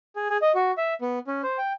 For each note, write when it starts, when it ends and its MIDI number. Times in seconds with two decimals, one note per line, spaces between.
0.16 0.28 68
0.30 0.37 68
0.42 0.52 75
0.55 0.72 66
0.78 0.94 76
1.02 1.19 59
1.27 1.42 61
1.43 1.58 72
1.58 1.73 79